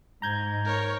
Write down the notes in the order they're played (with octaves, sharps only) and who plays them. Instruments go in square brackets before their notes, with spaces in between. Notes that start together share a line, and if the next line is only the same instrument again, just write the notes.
[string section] G#2 [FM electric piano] A#5 G6 G#6
[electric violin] A#4 C#5